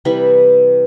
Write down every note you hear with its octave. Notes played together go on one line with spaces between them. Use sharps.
C3 E3 G3 B5